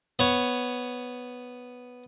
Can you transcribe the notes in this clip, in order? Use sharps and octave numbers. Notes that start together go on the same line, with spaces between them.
B3 C#5